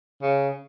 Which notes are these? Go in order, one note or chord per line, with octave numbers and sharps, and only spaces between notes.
C#3